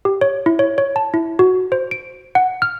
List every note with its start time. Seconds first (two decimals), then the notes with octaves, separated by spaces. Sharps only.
0.05 G4
0.21 C#5
0.46 E4
0.59 C#5
0.78 C#5
0.96 A5
1.14 E4
1.39 F#4
1.72 C5
1.91 D7
2.35 F#5
2.62 F6